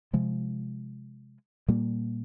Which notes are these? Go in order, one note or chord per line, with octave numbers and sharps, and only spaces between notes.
C3 F3 G#3
A#2 G3 A#3